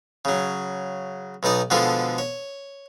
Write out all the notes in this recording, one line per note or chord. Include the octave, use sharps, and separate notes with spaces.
C#3 F#3
B1 B2 D#4 D5
B2 D3 F3 G#3 F4 A4
C#5